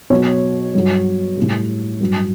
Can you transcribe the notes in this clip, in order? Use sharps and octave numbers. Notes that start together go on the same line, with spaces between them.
B2 F#3 C#5
G2 F#3
A2 G3
G2 F#3